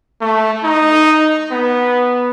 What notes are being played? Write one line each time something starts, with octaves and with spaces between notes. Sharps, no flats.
A3
D#4
B3